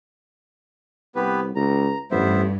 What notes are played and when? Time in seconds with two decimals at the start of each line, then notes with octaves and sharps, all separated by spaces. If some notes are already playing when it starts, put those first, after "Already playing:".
1.15 C2 B3 G4 B4
1.56 C#2 A#5
2.11 A1 G2 B3 C5 E5